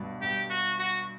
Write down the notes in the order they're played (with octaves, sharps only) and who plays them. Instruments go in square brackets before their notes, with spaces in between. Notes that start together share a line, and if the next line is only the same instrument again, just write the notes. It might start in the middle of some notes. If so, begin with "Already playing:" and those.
Already playing: [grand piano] G2 B2
[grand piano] G2 [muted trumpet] G4
[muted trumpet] F#4
F#4